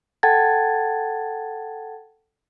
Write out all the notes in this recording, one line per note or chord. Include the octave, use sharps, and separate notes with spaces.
A4 F#5 G5 A5 G#6 A6